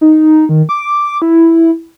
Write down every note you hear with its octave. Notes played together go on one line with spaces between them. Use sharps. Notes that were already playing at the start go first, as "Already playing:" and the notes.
D#4
D#3
D6
E4